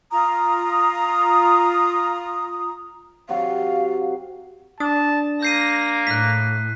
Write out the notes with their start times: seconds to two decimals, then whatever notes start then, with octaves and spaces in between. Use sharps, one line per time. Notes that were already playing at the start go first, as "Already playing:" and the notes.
0.11 F4 A#5 D#6
3.29 C3 F#3 F#4 F5
4.80 D4 A5 D#6
5.43 A#3 G6 A#6 C7 D#7
6.07 A2 F#6 B6